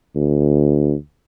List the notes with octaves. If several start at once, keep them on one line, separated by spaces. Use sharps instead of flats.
D2